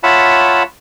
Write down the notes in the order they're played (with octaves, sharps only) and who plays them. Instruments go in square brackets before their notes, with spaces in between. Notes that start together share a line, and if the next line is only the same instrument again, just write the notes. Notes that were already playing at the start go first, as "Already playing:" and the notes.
[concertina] F4 C#5 E5 F#5 A5 B5